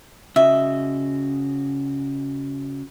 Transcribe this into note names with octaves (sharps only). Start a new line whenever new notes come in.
C#3 F#4 D#5 E5